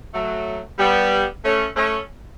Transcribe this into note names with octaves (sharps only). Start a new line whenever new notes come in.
F#3 A3
G3 B3
A3 C#4
A3 C#4